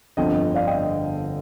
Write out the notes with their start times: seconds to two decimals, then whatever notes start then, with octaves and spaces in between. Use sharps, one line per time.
0.17 G1 F2 D3 F3 D#5 G5
0.55 D5 F5
0.67 D#5 G5